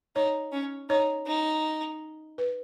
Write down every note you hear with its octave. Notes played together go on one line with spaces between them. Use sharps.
D#4 C#5
C#4
D#4 C#5
D#4
B4